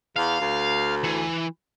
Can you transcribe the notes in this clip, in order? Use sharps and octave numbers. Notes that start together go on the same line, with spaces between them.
E2 F5
D2
E3